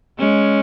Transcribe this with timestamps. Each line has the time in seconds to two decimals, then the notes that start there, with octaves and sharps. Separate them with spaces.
0.19 G#3 C#4